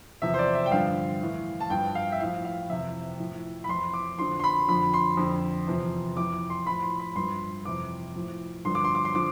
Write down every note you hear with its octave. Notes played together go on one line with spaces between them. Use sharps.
E2 C3 F3 E5
C5
D5
E5
G5
G2 D3 F3 F5
A2 E3
A5
G2 F3 G5
F5
E5
A2 F3 F5
F5
F2 C3 E3 E5
A2 F3
B5
F2 E3 C6
D6
F2 D3 F3 C6
C6
B5
F2 D3 F3 B5
C6
F2 D3 F3
E2 C3 F3
F2 E3 D6
D6
C6
A2 F3 B5
C6
B5
G2 F3 C6
F2 C3 E3 D6
A2 F3
G2 D3 F3 C6
D6
C6
D6
C6
D3 F3 D6